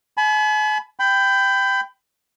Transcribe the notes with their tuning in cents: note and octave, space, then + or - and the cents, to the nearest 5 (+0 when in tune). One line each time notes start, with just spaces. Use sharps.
G#5 +45 B5 +10
G5 +0 B5 +30